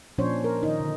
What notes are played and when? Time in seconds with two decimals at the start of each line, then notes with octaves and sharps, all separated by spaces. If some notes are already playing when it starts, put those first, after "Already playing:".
0.18 A#2 F3 C#4 D4 C5 C#5
0.44 A#4
0.63 D#3 D#4
0.80 D3